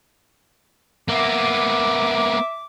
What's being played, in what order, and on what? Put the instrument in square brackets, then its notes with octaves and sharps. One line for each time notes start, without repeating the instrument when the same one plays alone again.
[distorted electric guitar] A#3 B3 [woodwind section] E5 D6